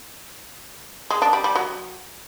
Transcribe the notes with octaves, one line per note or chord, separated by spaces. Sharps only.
G#3
D4
G3
G3
F#3